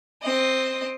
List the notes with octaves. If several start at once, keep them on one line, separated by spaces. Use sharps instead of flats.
C4 D#5